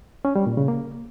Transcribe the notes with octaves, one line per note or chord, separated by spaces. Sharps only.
C#4
G3
A#2
C#3
A#3